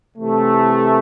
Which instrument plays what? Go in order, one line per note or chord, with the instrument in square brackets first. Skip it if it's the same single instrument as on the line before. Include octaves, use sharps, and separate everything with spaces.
[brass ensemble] C3 E3 A3